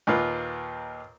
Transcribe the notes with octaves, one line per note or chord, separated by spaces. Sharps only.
D#2 A#2 F4 B4